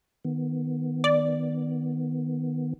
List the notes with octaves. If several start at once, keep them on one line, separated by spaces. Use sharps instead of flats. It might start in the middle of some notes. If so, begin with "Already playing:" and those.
D#3 B3
D5